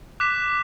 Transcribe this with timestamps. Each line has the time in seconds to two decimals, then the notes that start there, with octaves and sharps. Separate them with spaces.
0.20 D6 F#6 B6 E7